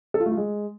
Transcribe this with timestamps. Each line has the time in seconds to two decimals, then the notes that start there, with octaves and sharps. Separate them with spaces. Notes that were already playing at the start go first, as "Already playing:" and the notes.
0.14 A4
0.20 F4
0.26 A3
0.32 F4
0.37 G#3